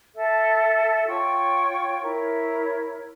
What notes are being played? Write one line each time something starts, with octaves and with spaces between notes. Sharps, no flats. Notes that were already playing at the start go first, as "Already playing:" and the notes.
A4 E5 A5
F4 C#5 G5 C#6
E4 A#4 C#5